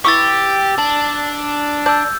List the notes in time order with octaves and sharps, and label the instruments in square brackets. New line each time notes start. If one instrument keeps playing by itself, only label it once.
[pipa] E3 E4 C#6 [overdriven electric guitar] G4 [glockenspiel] D6 E6 A6
[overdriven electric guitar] D4
[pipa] D5 A5 [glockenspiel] E6 G6